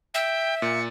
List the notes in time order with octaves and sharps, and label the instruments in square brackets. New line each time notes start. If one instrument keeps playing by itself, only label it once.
[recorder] E5 [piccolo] G5
[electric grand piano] A#2 [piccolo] C#7